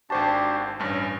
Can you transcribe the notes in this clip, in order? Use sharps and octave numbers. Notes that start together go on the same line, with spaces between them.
G#1 D4 F#4 G4 C5 A5
A1 G2 C#4